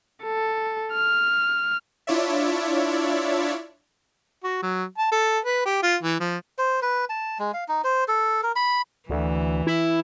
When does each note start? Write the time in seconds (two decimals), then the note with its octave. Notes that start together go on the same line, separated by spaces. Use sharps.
0.23 A4
0.93 F6
2.07 D4 E4 F4 C#5 D5 E5
4.43 F#4
4.62 F#3
4.98 A5
5.11 A4
5.45 B4
5.65 G4
5.83 F4
6.03 E3
6.20 F3
6.58 C5
6.82 B4
7.09 A5
7.39 G#3
7.54 F5
7.68 D#4
7.84 C5
8.08 A4
8.43 A#4
8.56 B5
9.09 D2 E3
9.67 E4